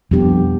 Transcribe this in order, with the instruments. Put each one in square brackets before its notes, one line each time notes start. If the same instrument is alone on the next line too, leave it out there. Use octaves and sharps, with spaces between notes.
[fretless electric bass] F2 [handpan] B2 G3 B3 D4 G4